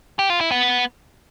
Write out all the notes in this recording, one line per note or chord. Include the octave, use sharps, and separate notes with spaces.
G4
F4
E4
B3